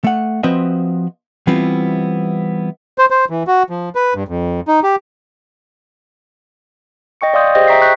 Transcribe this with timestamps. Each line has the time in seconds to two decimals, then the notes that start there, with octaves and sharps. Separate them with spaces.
0.04 A3 F#5
0.43 F3 C4 F#4 B4 D#5 E5
1.47 E3 G3 B3 C4 E4 F4
2.98 C5
3.10 C5
3.30 E3
3.47 F#4
3.70 F3
3.95 B4
4.15 G2
4.28 F2
4.68 D#4
4.83 G4
7.21 D#5 G5 C#6 C#7
7.34 D5 F5 C6 D#6 G6
7.55 G4 G#4 C5 D#5 G5 D#6
7.67 E5 G5 A#5 C#6 B6 C7
7.82 C#6 F#6 G6 B6